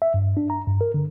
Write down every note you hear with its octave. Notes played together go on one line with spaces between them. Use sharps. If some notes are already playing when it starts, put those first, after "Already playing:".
E5
G2
D4
A#5
G2
A#4
D3